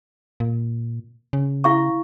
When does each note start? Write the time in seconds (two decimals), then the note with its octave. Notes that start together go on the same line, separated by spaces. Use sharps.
0.40 A#2
1.33 C#3
1.64 E4 F5 C#6